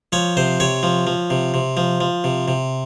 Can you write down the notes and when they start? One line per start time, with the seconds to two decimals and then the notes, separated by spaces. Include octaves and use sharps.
0.12 F3 C#5
0.37 C3 C5
0.60 C3 C#5
0.83 F3
1.07 F3
1.30 C3
1.54 C3
1.77 F3
2.01 F3
2.24 C3
2.48 C3